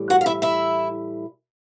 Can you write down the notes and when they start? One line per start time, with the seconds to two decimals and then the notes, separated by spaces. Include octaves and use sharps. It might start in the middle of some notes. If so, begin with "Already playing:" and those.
Already playing: A2 E3 G3
0.10 F#4 F#5
0.21 F5
0.26 E4 E5
0.42 E4 E5